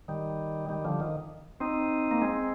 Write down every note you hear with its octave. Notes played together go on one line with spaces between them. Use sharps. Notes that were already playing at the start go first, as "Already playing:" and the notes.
D#3 G3
D#3 G3
D3 F3
D#3
C4 D#4
A#3
G#3 C4